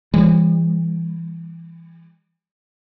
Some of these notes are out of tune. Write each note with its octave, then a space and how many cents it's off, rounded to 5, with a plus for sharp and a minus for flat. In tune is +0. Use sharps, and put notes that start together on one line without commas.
E3 +20 G3 +45